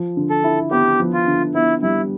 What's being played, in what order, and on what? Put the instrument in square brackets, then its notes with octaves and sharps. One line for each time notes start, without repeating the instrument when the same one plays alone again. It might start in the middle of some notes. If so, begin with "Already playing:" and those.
Already playing: [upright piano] F3
D3
[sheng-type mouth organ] A4
[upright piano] E4
[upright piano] B3 [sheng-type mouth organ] G4
[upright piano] F3
[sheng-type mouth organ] F4
[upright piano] D3
[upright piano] B3 [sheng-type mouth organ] E4
[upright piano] G3 [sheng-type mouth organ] E4